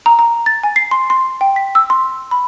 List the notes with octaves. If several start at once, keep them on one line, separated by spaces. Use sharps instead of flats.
A#5
A#5
A6
G#5
C7
C6
C6
G5
B6
E6
C6
B5